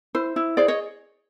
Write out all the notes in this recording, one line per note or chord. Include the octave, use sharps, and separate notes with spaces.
E4 C5
E4
G#4 C5 D5
C#5 D#5